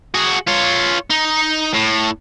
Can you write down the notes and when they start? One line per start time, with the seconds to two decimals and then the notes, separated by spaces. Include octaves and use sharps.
0.14 F#4 G#4
0.47 F4 C#5
1.11 D#4
1.74 A2